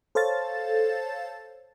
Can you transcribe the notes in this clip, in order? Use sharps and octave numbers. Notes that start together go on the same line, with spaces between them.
A4 C5 C#5 F5 A5 A6